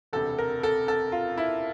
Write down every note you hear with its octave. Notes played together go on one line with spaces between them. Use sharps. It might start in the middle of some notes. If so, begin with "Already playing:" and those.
E1 D2 C3 A4
A#4
A4
A4
F4
E4